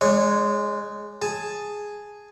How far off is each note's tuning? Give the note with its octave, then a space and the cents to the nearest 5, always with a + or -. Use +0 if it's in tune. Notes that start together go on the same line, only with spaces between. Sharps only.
G#3 +0 D4 +35 C#5 -10
G#4 +0 A5 +0